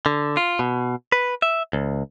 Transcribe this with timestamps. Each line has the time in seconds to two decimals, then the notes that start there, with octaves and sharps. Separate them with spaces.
0.06 D3
0.37 F4
0.59 B2
1.12 B4
1.42 E5
1.73 C#2